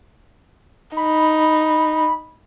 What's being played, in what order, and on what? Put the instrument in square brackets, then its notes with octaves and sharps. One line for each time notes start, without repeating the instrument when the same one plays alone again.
[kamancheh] D#4 [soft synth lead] B5